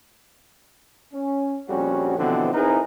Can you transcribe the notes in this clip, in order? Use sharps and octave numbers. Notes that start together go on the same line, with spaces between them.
C#4
A#1 F2 G3 C#4 F#4
B2 D3 E3 F3 B3 C4
C4 D#4 E4 G#4 A#4 B4